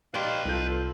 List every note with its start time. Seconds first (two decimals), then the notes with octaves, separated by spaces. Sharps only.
0.14 G4 B4 D5 D#5 F5 C6
0.45 C2 F4 A4 G6